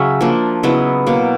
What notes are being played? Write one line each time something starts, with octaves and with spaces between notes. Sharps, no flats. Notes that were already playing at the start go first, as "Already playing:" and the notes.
Already playing: C#3 F#3 C#4 E5
F3 A#3 D4
C#3 F#3 B3 E4 D#5
B2 F#3 A#3